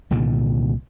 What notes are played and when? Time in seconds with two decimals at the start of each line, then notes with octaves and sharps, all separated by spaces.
0.11 C2 A#2 D3 D#3